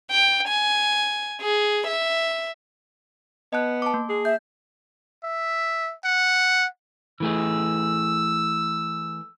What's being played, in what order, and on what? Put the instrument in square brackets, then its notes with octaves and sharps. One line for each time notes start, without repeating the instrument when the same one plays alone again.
[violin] G5
G#5
G#4
E5
[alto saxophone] B3 [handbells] D#5 A5 F#6
[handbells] A5 D6
A#3
[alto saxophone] G#4
[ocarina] E5 [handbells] G6
[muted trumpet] E5
F#5
[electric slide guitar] E3 A3 G#4 [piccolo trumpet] E6